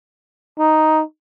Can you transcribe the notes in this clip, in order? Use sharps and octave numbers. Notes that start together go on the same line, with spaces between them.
D#4